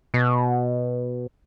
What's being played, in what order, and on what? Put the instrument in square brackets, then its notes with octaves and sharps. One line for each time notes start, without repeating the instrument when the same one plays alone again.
[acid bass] B2